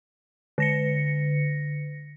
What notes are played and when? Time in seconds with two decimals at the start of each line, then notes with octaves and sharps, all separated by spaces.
0.58 D3 A#6 C#7